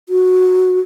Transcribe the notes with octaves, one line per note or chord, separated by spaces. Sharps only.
F#4